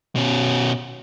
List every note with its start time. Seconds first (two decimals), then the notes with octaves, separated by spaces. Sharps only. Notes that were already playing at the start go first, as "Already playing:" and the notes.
0.15 B2 C#4